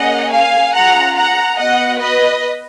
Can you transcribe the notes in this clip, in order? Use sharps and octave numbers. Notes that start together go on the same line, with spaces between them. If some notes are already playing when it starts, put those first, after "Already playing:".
Already playing: A#3 C#4 G#4 D#5 F#5
F5 G#5
C#4 F4 G#4 F#5 A#5
F#5 A#5
B3 F#4 D#5 F#5
B4 D#5